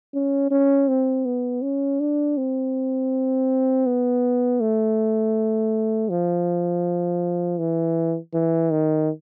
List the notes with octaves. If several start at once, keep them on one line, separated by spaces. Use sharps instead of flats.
C#4
C#4
C4
B3
C#4
D4
C4
B3
A3
F3
E3
E3
D#3